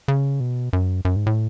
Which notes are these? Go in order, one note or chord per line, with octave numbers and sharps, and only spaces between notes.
C#3
B2
F#2
F#2
G#2
A2